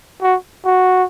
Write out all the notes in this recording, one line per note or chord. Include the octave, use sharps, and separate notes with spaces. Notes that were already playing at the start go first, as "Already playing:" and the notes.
F#4
F#4